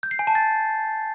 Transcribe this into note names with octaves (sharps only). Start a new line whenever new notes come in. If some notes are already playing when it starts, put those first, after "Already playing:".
G6
C7
G#5
A5
A6